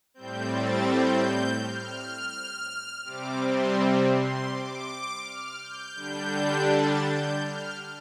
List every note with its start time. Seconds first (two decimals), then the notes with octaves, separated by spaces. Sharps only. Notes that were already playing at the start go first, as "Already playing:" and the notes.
0.14 A2 G3 C4 G6
0.51 A6
0.87 G6
1.60 F6
3.04 C3 G3 C4 D6
3.41 C6
4.14 C6
4.50 D6
5.22 F6
5.59 G6
5.95 D3 G3 D4 G6
6.67 A6
7.04 G6
7.40 F6